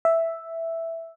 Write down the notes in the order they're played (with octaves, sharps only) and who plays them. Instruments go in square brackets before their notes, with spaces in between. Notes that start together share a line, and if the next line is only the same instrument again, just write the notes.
[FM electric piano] E5